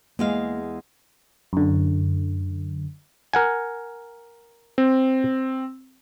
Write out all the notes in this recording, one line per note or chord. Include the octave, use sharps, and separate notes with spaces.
E2 G#3 A#3 F5
F#2 D3
A#4 F#5 G#5
C4